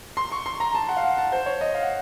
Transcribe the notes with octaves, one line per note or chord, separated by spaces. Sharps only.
C6
C#6
C6
A#5
A5
F#5
F5
F#5
A5
C5
C#5
D#5
F5
F#5